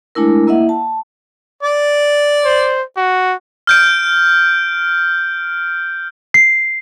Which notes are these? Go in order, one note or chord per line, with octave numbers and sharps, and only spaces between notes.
G#3 A3 D4 E4 A#4
A#3 E4 D#5 E5 F#5
A5
D5
C5
F#4
F6 G6 D7
C7